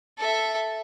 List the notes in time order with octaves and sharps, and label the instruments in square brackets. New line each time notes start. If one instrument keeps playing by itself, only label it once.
[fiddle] A4 E5